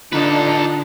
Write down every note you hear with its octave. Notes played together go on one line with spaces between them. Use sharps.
D3 D4 D#4 F4 A4 B4